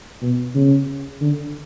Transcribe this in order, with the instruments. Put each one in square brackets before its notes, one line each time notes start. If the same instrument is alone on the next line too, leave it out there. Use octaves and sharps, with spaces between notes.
[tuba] B2
C#3
D3